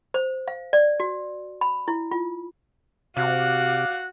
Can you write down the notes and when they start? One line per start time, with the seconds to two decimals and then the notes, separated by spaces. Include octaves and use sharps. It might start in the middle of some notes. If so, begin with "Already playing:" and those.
0.14 C5
0.48 F5
0.73 D5
1.00 F#4
1.61 B5
1.88 E4
2.11 F4
3.17 C3 F#4 D5 F5 F#6